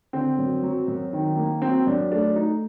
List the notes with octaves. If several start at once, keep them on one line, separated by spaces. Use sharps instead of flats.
D3 C4
F#2
F#3
F#2
D#3
A#3
F#3 C4
F#2 D4
A3 D4
A3 D#4